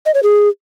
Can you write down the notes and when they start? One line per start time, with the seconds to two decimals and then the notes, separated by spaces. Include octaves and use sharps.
0.06 D#5
0.14 C#5
0.23 G#4